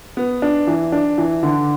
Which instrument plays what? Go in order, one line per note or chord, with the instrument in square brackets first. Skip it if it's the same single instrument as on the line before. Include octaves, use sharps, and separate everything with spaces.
[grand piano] B3
D4
E3
D4
E3
D3